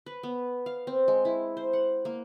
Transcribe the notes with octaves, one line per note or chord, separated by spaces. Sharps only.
B4
B3
F5
C4
G#3
E4
C5
F#5
A#3